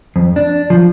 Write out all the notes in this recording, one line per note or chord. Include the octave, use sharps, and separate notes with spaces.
F2
D4
F3